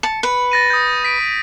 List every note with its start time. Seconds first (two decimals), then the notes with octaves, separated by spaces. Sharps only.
0.03 A5 C#7
0.23 B4
0.52 A6 A#6 D#7
0.70 D#6 G6
1.05 B6 D7